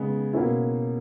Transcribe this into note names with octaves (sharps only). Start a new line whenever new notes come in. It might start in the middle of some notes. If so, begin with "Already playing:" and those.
Already playing: C#3 G#3 B3
B2 A#3 C#4 E4